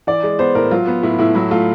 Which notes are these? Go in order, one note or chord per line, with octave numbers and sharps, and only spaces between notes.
E3 D5
G#3
B3 C5
A2 A#4
F#3 F4
B3
A2 E4
A2 E4
F#3 E4
A3 F4